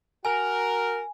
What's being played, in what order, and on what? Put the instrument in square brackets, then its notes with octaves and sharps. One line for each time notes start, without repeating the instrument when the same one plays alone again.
[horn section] F#4 A#4 [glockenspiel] G#5